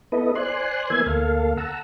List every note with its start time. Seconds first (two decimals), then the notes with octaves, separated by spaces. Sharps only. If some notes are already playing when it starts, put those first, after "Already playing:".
0.12 B3 E4 A4 B4 D#5
0.35 C5 D5 G#5 C6 F#6
0.90 E3 A#3 B3 E5 G#5 G#6
1.06 D2 A#3 A4 F5
1.57 F#5 A5 A#5 E6